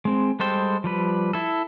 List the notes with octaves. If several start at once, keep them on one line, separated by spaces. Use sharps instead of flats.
G#3 C4
G3 G#3 A4 C5 G5
F3 G3 B4
E4 A4